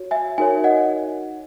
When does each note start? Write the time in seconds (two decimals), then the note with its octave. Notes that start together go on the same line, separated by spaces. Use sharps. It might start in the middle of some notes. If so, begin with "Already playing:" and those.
Already playing: F#4 C#5
0.11 E5 G#5
0.38 D#4 F#4 A#4 C#5 E5 G#5
0.64 D#5 F#5